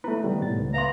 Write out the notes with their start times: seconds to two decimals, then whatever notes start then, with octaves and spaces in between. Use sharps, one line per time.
0.04 A3 B3 E4 B4
0.24 C3 D#3 G3
0.42 A2 A6
0.58 C#2
0.74 B4 E5 F5 A#5 C6